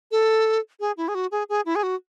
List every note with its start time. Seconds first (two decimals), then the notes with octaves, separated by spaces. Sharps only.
0.11 A4
0.80 G#4
0.97 E4
1.08 G#4
1.15 F#4
1.31 G#4
1.49 G#4
1.65 E4
1.75 G#4
1.83 F#4